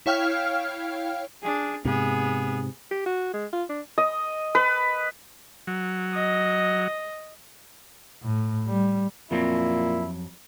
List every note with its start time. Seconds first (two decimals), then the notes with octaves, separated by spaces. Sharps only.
0.06 E4 C#5 F5 G5 F6
1.43 D4 G#4
1.85 G#2 C3 B3 G#4
2.91 G4
3.06 F#4
3.34 G#3
3.53 F4
3.70 D4
3.98 D#5
4.55 B4
5.67 F#3
6.14 D#5
8.23 A2
8.67 G3
9.31 F2 A#2 F#3 C4 E4